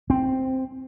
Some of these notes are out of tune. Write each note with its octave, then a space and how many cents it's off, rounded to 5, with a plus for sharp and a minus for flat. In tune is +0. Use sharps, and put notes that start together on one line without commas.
C4 +0